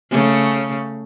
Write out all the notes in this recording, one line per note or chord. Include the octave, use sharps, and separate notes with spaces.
C#3 A3